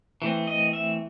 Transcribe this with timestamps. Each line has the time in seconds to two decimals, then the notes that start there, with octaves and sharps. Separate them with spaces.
0.22 E3 A3 C4
0.47 D#5
0.73 E5